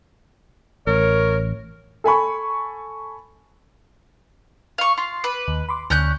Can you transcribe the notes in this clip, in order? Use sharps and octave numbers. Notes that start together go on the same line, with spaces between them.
A1 A#4 C#5
A4 G#5 B5 C#6
F5 C#6
F4 C6 C7
B4 D6
D#2
B5 C6 D6
D2 C#4 F#6 G6